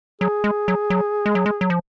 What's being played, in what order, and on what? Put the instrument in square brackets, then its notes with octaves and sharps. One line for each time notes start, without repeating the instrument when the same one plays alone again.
[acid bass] F#3 [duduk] G#4
[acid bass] G#3
F#3
F#3
G#3
F#3
G#3
F#3
F3